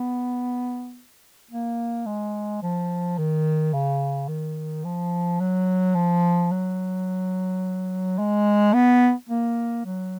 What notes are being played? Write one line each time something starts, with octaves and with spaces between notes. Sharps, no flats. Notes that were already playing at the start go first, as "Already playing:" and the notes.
Already playing: B3
A#3
G#3
F3
D#3
C#3
D#3
F3
F#3
F3
F#3
G#3
B3
A#3
F#3